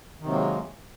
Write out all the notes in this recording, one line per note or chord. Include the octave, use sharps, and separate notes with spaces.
C3 D#3 F#3 G#3 A#3